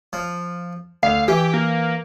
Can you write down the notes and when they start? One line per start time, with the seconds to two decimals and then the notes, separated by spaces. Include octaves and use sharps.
0.13 F3
1.03 D2 F5
1.28 E3 G4
1.54 A#3